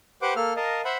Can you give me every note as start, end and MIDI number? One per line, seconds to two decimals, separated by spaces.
0.22 0.34 67
0.22 0.34 71
0.22 0.34 72
0.22 0.34 78
0.22 0.34 86
0.36 0.53 58
0.36 0.53 69
0.36 0.53 89
0.56 0.81 70
0.56 0.81 75
0.56 0.81 77
0.56 0.81 81
0.85 0.97 72
0.85 0.97 76
0.85 0.97 78
0.85 0.97 83